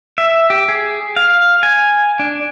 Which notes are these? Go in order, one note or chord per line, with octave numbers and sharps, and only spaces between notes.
E5
G4
G#4
F5
G#5
D4